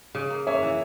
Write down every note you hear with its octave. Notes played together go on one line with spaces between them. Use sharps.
C#3
A#3
A#3 C#5 E5
E3